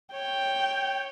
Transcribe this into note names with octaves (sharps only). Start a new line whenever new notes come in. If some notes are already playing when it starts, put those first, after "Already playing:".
C#5 G5